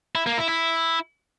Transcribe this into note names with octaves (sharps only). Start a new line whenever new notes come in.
E4
A#3
E4
E4